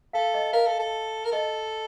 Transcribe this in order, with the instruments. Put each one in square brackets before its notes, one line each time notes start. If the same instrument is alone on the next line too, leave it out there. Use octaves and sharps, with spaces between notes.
[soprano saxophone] A4 [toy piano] F5
[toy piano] D#5
[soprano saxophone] A#4 [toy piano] F5
[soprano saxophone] A4
A4
A#4
[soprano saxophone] A4 [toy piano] D#5